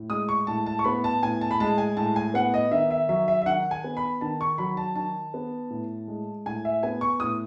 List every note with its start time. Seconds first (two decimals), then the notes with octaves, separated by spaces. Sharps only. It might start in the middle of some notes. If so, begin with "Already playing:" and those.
Already playing: A2
0.10 G#3 D#6
0.29 C#6
0.47 A2 A5
0.66 A5
0.79 C#6
0.84 B3 B5
1.04 A5
1.22 A2 G#5
1.41 A5
1.51 B5
1.60 G#3 A5
1.78 G#5
1.97 A2 A5
2.16 G#5
2.34 B3 F#5
2.54 D#5
2.71 D#3 E5
2.91 E5
3.09 F#3 E5
3.28 E5
3.42 E5
3.46 D#3 F#5
3.71 G#5
3.84 B3
3.97 B5
4.21 D#3 A5
4.41 C#6
4.58 F#3 B5
4.77 A5
4.96 D#3 A5
5.34 B3
5.70 A2
6.08 G#3
6.46 A2 G#5
6.65 E5
6.83 B3 G#5
7.01 C#6
7.20 A2 D#6